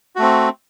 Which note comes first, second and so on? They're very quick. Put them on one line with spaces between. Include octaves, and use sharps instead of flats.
F#4 A3 C4